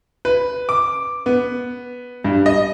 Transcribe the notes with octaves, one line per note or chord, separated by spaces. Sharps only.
B4
D6
B3
G2
D#5